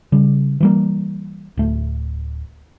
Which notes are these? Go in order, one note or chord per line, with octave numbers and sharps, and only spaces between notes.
C#3 G3
E3 G3 A#3
D1 A3